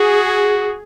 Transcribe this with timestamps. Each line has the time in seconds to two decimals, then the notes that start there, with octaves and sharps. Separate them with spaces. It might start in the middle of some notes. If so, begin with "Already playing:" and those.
Already playing: F#4 G#4